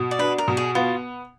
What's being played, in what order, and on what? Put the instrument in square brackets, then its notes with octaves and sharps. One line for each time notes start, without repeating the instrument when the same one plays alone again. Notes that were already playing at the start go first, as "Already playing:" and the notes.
Already playing: [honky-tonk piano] B2
[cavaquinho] D5
[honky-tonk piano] D4 [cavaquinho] B4
[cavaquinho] A#4
[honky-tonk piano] B2
[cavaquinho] G#4
[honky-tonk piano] B3 [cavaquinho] F4